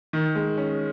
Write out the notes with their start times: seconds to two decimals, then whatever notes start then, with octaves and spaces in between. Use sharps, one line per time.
0.13 D#3
0.35 G#3
0.57 C#4